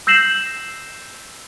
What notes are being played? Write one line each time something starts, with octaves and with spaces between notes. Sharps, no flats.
E6 G6 A#6 C7 E7 F#7